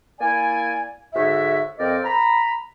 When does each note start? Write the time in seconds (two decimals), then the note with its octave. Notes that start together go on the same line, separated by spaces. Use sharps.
0.20 A#3 E4 D5 G#5
1.14 G#2 D3 F#4 C#5 E5
1.78 F2 C4 A#4 C5 D5 D#5
2.04 A#5 B5